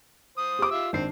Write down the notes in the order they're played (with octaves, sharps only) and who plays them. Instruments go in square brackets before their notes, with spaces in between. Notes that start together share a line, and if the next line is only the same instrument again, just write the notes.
[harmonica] C5 D#6
[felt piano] G4 D6
[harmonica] F4 E5 E6
[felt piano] G#1 D4 C7 [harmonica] C4